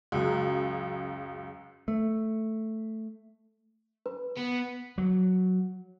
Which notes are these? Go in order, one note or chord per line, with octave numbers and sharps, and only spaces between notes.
C#2 F#2
A3
B4
B3
F#3